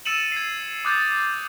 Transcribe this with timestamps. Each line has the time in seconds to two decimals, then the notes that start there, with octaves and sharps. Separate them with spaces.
0.05 E6 A6 C#7 D#7 E7 F#7
0.32 G#6 C7
0.85 D6 D#6 F#6 G6 A6